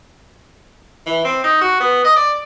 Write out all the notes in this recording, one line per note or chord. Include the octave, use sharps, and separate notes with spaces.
E3
C4
D#4
F#4
B3
D#5
D5